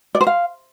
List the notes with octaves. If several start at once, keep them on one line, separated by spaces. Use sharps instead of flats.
D5
C5
F5